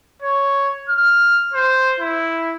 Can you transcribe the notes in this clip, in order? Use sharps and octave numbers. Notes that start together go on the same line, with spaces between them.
C#5
F6
C5
E4